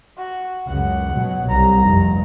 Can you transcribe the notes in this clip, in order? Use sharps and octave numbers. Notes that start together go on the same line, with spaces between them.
F#4
C#2 F#2 F#5
B2 F#3
C2 A#5
F1 G2